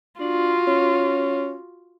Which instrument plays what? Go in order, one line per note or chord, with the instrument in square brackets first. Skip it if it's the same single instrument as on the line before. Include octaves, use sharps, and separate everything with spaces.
[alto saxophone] D4 [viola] F4 F#4
[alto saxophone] C#4